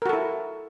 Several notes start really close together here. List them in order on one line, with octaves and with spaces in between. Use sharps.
A#4 F#4 A4 E4